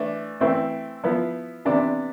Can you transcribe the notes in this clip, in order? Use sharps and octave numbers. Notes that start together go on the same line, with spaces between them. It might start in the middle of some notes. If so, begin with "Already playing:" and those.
Already playing: E3 A3 D4
E3 A3 C4 E4
F3 B3 E4
C3 E3 B3 D4